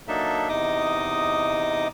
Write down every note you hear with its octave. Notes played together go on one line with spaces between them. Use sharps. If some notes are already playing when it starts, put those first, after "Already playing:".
F#3 A#3 D4 D#4 A4 E5
E2 C3 D#4 D#5 D6 D#6